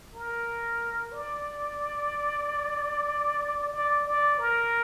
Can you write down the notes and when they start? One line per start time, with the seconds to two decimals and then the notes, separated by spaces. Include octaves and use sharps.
0.14 A#4
1.12 D5
3.73 D5
4.06 D5
4.39 A#4